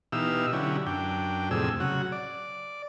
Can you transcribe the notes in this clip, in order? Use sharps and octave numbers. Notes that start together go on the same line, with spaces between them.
B2 E3 D#4 G4 F5 E6
D3 F#3 C#4 E4 G4
F#2 D4 G5
F2 A2 C3 G#4 E6
C#3 F#3 F#4
D5